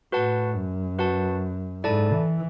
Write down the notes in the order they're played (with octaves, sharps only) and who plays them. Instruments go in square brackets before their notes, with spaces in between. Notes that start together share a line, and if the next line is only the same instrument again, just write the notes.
[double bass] A2 [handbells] F#4 B4 F#5 A5
[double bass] F#2
[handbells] F#4 B4 F#5 A5
[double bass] G#2 [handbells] E4 A4 D5 A5
[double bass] E3